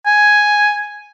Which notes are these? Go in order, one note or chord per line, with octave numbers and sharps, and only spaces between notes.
G#5